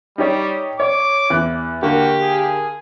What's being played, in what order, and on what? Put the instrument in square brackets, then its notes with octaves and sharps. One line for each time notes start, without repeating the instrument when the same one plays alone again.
[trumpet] G3 [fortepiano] D#4 G4 C#5
[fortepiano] C#5 [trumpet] D6
[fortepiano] E2 F#6
[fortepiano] D3 A#3 [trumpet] F#4 [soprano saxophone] G4
[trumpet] G#4